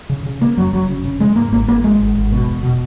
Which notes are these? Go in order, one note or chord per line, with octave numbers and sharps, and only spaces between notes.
C#3
C#3
C#3 A#3
F#2 F#3
F#1 F#3
C#3
C#3
C#3 G#3
G#2 A#3
G#1 A#3
G#1 A#3
G#1 G#3
G#1
G#1
B2
E1
B2